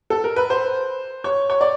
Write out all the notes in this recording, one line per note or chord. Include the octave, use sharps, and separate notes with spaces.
A4
A#4
B4
C5
C#5
C#5
D5